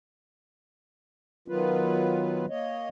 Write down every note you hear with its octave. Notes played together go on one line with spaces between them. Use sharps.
D#3 F#3 B3 F4 B4
A#3 C#5 D#5